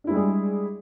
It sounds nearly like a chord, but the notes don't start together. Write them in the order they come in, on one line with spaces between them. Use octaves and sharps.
D4 E4 G#3 G3 G#4